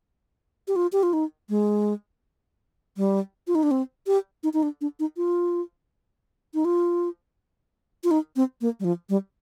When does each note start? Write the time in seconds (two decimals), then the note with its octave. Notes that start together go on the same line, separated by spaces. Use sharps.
0.68 G4
0.76 F4
0.93 G4
1.03 F4
1.13 D#4
1.49 G#3
2.97 G3
3.47 F4
3.55 D#4
3.63 D4
3.71 C4
4.07 G4
4.43 D#4
4.53 D#4
4.63 D4
4.81 D4
5.00 D#4
5.17 F4
6.54 D#4
6.65 F4
8.04 F4
8.11 D#4
8.36 C4
8.61 A#3
8.80 G3
8.84 F3
9.09 G3